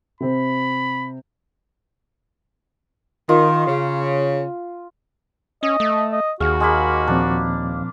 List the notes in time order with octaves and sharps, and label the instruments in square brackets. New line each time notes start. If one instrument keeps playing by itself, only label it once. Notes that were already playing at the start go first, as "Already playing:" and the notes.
[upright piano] C3 C4 [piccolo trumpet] B5
[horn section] D#3 [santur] F4
[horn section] C#3
[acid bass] C#4 [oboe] D#5
[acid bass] A3
[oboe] D#5
[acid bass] D#2 [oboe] F#4 [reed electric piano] G#4 [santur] F5
[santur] G#3 A#3 B5
[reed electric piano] A#2 F3 C4 [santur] D4